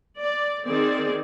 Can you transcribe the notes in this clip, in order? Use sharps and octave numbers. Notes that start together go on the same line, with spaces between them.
D5
D#3 C4 G#4 D5